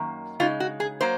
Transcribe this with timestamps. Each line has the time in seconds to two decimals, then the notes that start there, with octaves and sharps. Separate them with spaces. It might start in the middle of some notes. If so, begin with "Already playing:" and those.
Already playing: F#2 D#3 A#3
0.40 C#3 G#3 D#4 F4
0.60 F#4
0.80 G#4
1.01 F#3 A#3 C5